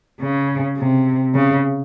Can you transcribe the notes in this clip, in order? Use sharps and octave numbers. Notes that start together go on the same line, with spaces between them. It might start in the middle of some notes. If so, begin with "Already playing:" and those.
C#3
C3
C#3